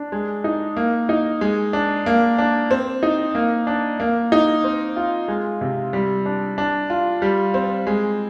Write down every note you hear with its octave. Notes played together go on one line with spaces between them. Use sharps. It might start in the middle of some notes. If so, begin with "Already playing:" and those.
Already playing: D4
G#3
D#4
A#3
D#4
G#3
D4
A#3
D4
C4
D#4
A#3
D4
A#3
D#4
C4
F4
G#3
C3
G3
D4
D4
F4
G3
C4
G#3